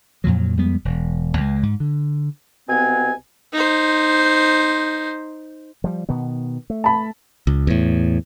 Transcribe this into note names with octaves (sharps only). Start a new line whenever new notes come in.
F2 A#2 F3 F#3
F2 G3 G#3 B3
E1
C#2 F3 G#3
G#2
D3
C2 B2 B3 C4 G#5
D#4 C5
F3 G3
B2 D#3 B3
A3
A5 B5
C#2
E2 A2